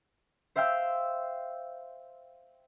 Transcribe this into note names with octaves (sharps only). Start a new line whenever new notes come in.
C5 E5 F5 G5 E6